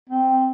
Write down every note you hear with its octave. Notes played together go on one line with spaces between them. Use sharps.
C4